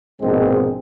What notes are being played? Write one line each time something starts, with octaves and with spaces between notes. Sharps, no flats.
A#1 G#2 B2 G#3 C4